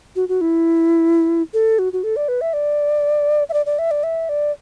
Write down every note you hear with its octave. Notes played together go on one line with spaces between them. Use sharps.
F#4
F#4
E4
A4
F#4
F#4
A4
D5
B4
E5
D5
E5
D5
D5
E5
D5
E5
D5